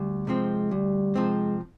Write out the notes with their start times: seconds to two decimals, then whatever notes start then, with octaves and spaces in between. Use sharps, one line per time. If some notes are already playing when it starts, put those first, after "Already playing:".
Already playing: D2 G3
0.27 C3 F3 G#3 C4
0.71 D2 G3
1.15 C3 F3 G#3 C4